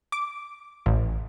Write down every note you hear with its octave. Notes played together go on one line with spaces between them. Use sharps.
D6
A1